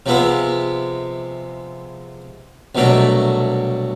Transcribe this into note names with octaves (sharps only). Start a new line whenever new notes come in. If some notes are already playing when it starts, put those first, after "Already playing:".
C3 F3 G#3 B3 E4
C2 B2 F#3 A3 D4